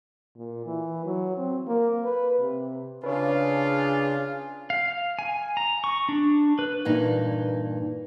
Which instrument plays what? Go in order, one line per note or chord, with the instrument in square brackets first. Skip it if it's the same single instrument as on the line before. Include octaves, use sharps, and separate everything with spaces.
[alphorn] A#2
E3
F#3
C4
A#3
B4
C3
[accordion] C#3 [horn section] D4 F4 [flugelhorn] G#4 [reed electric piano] B4 C#5
[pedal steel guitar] F5
G#5
A#5
C#6
D4
B4
[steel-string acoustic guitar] G2 A#2 E3 D#4